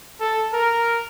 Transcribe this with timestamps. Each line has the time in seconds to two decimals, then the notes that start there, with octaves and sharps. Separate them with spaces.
0.20 A4
0.53 A#4